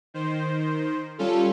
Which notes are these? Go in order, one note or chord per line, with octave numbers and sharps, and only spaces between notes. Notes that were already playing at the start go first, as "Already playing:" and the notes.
D#3 C5
G3 C#4 F4 A4